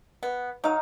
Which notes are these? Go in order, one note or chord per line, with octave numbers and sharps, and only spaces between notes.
B3
F#3 D#4 F5